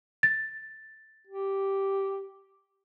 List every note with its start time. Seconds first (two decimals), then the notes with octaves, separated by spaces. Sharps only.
0.23 A6
1.27 G4